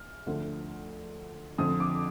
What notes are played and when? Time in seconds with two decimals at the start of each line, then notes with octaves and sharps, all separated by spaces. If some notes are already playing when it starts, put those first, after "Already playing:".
Already playing: F6
0.26 D2 D3 F3 A3
1.58 F2 D3 F3 D#6
1.80 D6